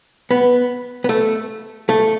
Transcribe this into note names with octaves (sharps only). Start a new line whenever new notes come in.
B3
B3
A3
A3